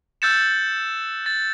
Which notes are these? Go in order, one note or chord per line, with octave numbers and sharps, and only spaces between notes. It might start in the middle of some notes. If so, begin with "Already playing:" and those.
E6 F#6 G6 A6 C#7 E7
A6